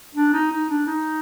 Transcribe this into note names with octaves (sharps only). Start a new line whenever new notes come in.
D4
D#4
D#4
D4
D#4